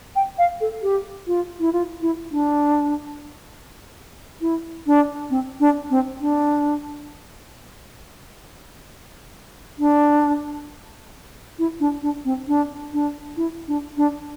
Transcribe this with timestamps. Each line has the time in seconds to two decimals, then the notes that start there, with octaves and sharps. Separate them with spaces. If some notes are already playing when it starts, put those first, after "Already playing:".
0.16 G5
0.38 F5
0.61 A4
0.82 G4
1.27 F4
1.60 E4
1.73 F4
2.01 E4
2.31 D4
4.41 E4
4.86 D4
5.30 C4
5.60 D4
5.90 C4
6.21 D4
9.78 D4
11.59 E4
11.80 D4
12.02 D4
12.25 C4
12.48 D4
12.93 D4
13.37 E4
13.68 D4
13.97 D4